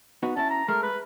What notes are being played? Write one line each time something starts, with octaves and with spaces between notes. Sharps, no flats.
B3 D#4 F#4
C#4 E4 A5
A#5
G#3 A3 A#4
B4